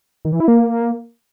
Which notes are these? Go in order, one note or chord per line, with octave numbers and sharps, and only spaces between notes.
D#3
E3
E4
A#3